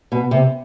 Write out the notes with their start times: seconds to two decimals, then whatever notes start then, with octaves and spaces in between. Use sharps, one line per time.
0.12 B2
0.31 C3